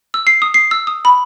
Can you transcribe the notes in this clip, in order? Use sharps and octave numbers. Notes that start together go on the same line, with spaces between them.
E6
C7
D#6
C7
E6
D#6
B5